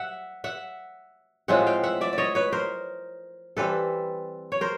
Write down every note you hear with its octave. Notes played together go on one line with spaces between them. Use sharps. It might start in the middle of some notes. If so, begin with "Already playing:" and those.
Already playing: E5 F#5
E5 F#5
A2 F3 G#3 C4 E5 F#5
F5 G5
E5 F#5
D5 E5
D5
C#5 D#5
B4 C#5
A#4 C5
E3 G3 C4 A4 B4
C#5
A#4 C5